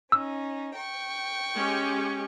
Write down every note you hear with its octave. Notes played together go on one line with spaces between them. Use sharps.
C#4 D#4 E6
G5 C#6
G#3 C#4 G4